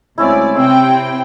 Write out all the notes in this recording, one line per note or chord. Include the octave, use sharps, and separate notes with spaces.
D2 G#3 C4 C#4 E4 D5
C3 C4 G5 C6 E6